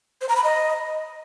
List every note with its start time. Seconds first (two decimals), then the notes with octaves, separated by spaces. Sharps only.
0.21 C5
0.29 A#5
0.36 B5
0.44 D#5